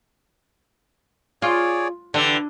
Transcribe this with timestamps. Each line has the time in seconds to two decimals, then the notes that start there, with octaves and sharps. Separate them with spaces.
1.42 F4 G#4 C#5 D5
2.14 D3 E3 G4